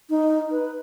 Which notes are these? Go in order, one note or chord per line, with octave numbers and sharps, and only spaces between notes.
D#4
B4